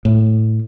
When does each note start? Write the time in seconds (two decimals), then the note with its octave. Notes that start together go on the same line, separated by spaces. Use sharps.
0.05 A2